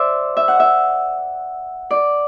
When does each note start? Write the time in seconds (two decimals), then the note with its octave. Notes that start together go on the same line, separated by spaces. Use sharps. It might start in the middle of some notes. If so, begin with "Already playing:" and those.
Already playing: C5 D5 E5
0.37 E5
0.48 F#5
0.60 E5
1.91 D5